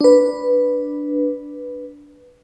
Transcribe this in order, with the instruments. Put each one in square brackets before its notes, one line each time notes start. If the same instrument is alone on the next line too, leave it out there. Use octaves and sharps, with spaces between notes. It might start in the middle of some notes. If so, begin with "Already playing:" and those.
[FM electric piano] D4 B4